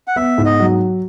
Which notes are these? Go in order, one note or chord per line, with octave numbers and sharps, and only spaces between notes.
F#5
B3 E5
G#2
D#5
F#3